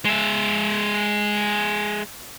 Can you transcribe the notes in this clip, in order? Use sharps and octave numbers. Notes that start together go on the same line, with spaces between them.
G#3 E5